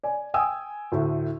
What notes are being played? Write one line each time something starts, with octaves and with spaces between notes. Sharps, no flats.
D5 G#5
G5 G#5 D#6 E6
D2 A2